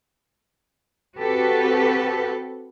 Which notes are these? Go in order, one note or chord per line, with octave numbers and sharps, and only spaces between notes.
C4 F#4 G4 A4 B4